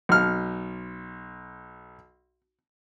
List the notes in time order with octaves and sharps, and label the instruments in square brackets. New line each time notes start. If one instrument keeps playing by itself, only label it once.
[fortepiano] B1 F6